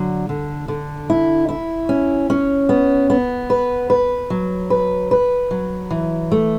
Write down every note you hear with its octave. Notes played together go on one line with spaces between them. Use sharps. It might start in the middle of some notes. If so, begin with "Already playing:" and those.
Already playing: D3 F#3
D3
D3
E4
E4
C#4
C#4
B3
B3
B4
B4
F#3
B4
B4
F#3
E3
A3